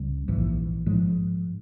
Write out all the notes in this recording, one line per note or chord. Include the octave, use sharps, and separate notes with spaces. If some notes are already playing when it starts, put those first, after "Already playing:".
Already playing: C#2 C#3 G3
A#1 G#2 E3
G#2 F3 G#3